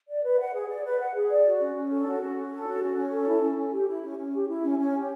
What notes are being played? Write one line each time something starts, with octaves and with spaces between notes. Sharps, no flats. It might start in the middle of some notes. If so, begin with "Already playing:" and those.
D5
B4
F#5
G#4
D5
B4
F#5
G#4
D5
F#4
C#4
C#4
A4
F#4
C#4
C#4
A4
F#4
C#4
C#4
A4
E4
C#4
C#4
G4
E4
C#4
C#4
G4
E4
C#4
C#4
G4